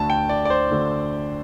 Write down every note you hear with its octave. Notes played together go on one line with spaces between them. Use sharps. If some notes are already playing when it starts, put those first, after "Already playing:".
Already playing: D2 D3 A5
G5
D5
D5
C5
D2 D3